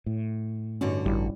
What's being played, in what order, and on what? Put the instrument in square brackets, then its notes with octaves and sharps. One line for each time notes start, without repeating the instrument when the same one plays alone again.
[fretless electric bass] A2
[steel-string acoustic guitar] G2 D3 F#4 [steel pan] C#4 D#4
[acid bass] A1 [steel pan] G3 E4